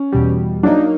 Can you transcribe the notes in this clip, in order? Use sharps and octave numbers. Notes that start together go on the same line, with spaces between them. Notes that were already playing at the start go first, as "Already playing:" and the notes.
Already playing: C#4
E2 B2 G3
F#3 A#3 D4 D#4